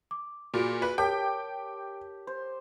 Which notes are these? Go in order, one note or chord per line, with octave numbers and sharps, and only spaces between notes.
D6
A#2 F#4 G#4 D7
B4
G4 A#4 C#5 G5 A5
C5